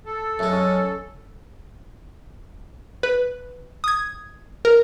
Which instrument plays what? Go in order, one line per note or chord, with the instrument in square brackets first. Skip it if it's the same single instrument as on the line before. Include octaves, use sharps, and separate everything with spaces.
[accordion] A4
[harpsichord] F#2 G#3 [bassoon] A3
[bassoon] C#4
[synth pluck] B4
D#6 G#6
A#4